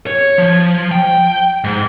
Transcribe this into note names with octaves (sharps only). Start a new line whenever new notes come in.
C#5
F3
G5
G#2